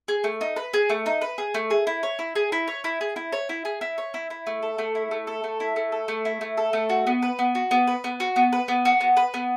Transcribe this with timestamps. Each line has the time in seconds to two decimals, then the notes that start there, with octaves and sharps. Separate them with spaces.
0.08 G#4
0.24 A3
0.41 D#4
0.56 B4
0.74 G#4
0.90 A3
1.06 D#4
1.21 B4
1.38 G#4
1.54 A3
1.70 G#4
1.87 E4
2.03 C#5
2.19 E4
2.35 G#4
2.52 E4
2.68 C#5
2.84 E4
3.01 G#4
3.16 E4
3.32 C#5
3.49 E4
3.65 G#4
3.81 E4
3.98 C#5
4.14 E4
4.30 E4
4.47 A3
4.63 A4
4.78 A3
4.95 E4
5.11 A3
5.27 A4
5.44 A3
5.60 E4
5.76 A3
5.92 A4
6.08 A3
6.25 E4
6.41 A3
6.57 A4
6.73 A3
6.90 F#4
7.07 B3
7.22 B4
7.39 B3
7.55 F#4
7.71 B3
7.87 B4
8.04 B3
8.20 F#4
8.36 B3
8.53 B4
8.68 B3
8.85 F#4
9.01 B3
9.17 B4
9.34 B3